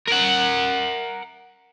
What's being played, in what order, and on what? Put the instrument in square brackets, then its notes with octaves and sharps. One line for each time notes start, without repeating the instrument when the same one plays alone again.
[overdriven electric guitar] A#4 F#5